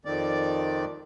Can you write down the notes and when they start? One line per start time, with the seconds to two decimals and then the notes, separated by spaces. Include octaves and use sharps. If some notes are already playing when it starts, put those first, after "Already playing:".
0.05 F2 D#3 D5